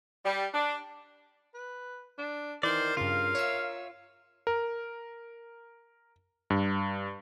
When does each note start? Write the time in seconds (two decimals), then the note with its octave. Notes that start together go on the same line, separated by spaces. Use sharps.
0.24 G3
0.53 D4
1.55 B4
2.18 D4
2.63 D#3 E3 A#4 C5 D5
2.97 G2 C#3 F4 F5
3.35 C#5 E5 E6
4.47 A#4
6.50 G2